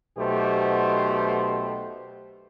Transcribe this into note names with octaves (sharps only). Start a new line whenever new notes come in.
B1 B2 A3 G4 C5